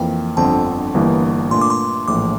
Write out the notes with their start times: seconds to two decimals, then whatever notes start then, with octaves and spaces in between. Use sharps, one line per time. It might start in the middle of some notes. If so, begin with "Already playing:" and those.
Already playing: F2 E3 A#3 G5
0.37 G1 F2 D3 F3 C4 A5
0.94 G1 G2 E3 A#3
1.51 A#2 A3 D4 C6
1.61 D6
1.70 C6
2.08 A#1 A2 E3 D6